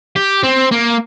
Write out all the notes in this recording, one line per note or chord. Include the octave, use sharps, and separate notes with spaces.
G4
C4
A#3